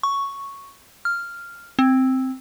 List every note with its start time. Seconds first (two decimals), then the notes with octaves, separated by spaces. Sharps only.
0.03 C#6
1.05 F6
1.79 C4